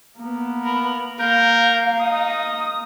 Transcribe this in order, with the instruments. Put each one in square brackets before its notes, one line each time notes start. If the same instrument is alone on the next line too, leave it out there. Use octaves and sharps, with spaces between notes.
[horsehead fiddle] A#3 B3
[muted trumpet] A#4 [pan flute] B5
[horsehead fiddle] A#3 [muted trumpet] A#4 [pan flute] F5 [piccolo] G6
[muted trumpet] D#4 [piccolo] D#6